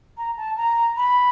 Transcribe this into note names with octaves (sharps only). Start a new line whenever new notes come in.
A#5
A5
A#5
B5